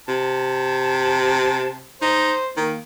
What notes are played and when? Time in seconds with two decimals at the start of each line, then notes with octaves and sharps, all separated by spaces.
0.08 C3 A5
2.02 D#4 C5
2.57 D#3 A#3